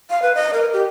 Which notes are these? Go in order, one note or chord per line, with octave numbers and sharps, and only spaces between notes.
F5
B4
D#5
A#4
G4